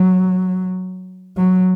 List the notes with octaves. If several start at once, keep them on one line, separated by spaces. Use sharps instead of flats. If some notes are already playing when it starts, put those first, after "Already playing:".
Already playing: F#3
F#3